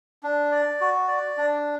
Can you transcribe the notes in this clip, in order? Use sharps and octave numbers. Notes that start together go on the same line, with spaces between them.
D4
D5
F#4
D5
D4